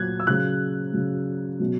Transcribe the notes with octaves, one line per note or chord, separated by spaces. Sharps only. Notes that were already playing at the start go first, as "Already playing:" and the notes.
Already playing: A#2 F#3 F#6 G#6
E6
C#3 F#3 F#6
C#3 F#3
B2 F#3